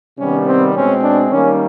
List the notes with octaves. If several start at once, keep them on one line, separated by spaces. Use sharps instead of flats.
C3 D#3 G3 B3 C#4
C4
B2 G#3 C4 C#4
D4
D#3 G3 A#3 C#4